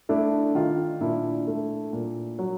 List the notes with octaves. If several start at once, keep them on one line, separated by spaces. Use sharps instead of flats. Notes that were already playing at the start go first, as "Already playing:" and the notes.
A3 D4 E4
D#3 D#4 F4
A#2 D4 E4
A3
A#2
F#3